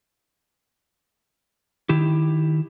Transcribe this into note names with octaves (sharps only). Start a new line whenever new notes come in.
D#3 E4 G4